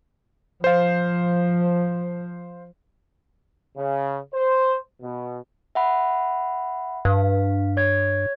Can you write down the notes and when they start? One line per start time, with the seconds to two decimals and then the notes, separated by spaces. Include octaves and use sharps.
0.64 F3 C5 F5
3.77 C#3
4.34 C5
5.02 B2
5.75 E5 F#5 B5
7.05 G2 F5
7.77 C#5 G#6